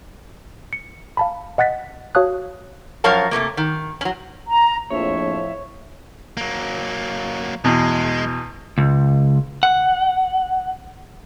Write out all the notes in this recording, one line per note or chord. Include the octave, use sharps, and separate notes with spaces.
C#7
F5 A5 B5
D#5 F#5 F#6 A6 B6
F#4 C#5 F5 A5 D#6 F#6
F#2 F3 A#4 C#5 F5 A5
C3 D#3 A3 A#3
D#3
F#3 C#4
A#5
A#1 F2 A2 F3 C#5 E5
F#3 A#3
E2 B2 G#3
C#2
F#5